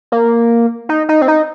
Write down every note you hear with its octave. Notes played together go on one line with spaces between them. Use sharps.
A#3
D#4
D#4
C4
D#4